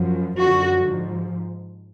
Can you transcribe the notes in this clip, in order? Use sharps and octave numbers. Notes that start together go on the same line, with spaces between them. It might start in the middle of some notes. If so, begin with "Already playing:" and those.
Already playing: F#2 F3
F#2 D3 F3 F#4
G#2 F3